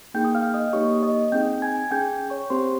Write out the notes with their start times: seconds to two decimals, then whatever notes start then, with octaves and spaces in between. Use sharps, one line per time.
0.14 A#3 D#4 G#4 G5 G6
0.25 D#6
0.35 F5 F6
0.54 D#5 D#6
0.73 A#3 D#4 G4 C#5 C#6
1.03 D#5 D#6
1.32 C4 D#4 G#4 G5 G6
1.62 G#5 G#6
1.91 C#4 G#4 G5 G6
2.30 C#5 C#6
2.50 C4 G4 C5 C6